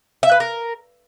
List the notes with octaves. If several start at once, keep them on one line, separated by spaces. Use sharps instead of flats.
E5
B4
A#4